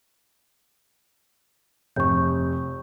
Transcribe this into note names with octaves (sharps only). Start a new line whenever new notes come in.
F1 C#6 G6